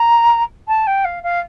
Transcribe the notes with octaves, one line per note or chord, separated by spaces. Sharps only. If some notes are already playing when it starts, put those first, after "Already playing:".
Already playing: A#5
A5
G5
F5
F5